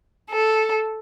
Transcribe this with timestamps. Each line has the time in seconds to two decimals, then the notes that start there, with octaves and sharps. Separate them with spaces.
0.30 A4